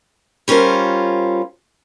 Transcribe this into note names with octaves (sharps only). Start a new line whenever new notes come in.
G3 C#4 F4 A#4 C5